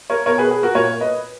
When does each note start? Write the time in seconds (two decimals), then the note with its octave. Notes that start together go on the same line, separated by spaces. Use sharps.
0.10 A#4 C#5
0.26 B2 A#4 C#5
0.38 G#4 B4
0.51 G#4
0.63 F#4 A#4
0.75 A#2 A#4 C#5
1.01 B4 D#5